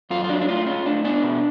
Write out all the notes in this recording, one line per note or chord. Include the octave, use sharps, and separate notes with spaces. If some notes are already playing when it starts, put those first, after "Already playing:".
F#2 F4
F4
F#3 D4
D4
A2 F4
C#4 F4
A2 D4
B3 D4
B2